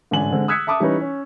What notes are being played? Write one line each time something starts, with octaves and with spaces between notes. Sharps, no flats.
A1 G#2 D3 D4 G#5 F#7
D3 G#3 C4
D#6 E6 F#6 G#6 B6 C#7
E5 A5 D6 D#6
E3 G3 C#4 D#4 E4 B4
C#4